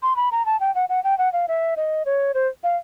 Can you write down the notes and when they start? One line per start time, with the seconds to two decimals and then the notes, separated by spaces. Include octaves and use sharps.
0.03 C6
0.16 B5
0.32 A#5
0.46 A5
0.60 G5
0.75 F#5
0.89 F#5
1.04 G5
1.18 F#5
1.33 F5
1.48 E5
1.77 D#5
2.06 C#5
2.34 C5
2.64 F5